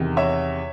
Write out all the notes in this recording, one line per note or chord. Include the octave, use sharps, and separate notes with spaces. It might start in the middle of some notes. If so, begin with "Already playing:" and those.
Already playing: E2 C3 D#3
C#5 E5